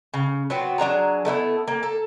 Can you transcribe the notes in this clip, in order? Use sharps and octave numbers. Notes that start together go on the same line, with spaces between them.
C#3
F#3 B3 C4
F#3 D4 G#4 A#5
A3 B3 D#4 E4
A#3
A4